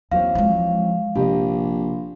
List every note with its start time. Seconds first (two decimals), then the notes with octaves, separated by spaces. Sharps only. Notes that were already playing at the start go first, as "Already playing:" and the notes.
0.12 D#2 E3 F#3 C4 F5
0.35 F3 G#3
1.15 A#1 C3 G4 D#5